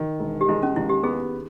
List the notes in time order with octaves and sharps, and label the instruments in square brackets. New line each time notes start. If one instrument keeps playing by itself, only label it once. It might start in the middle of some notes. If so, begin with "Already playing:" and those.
Already playing: [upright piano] D#3
E1
[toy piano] G4
[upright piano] G#3 [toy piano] E4
[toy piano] C#4
[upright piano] D#2 [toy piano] E4
[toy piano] G4
[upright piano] B3 [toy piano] G#4